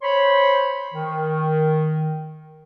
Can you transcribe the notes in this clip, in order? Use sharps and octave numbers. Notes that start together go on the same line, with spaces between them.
C5 C#5 B5 C6
D#3